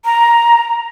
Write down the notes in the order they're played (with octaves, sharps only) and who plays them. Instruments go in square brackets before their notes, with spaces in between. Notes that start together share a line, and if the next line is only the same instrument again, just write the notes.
[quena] A#5